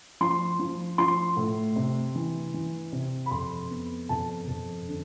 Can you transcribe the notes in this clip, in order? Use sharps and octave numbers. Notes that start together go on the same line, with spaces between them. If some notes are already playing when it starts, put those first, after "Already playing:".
F3 C6
F3
F3 C6
A2
C3
E3
E3
C3
B5
F2 C6
B3
F2 A5
F2
D3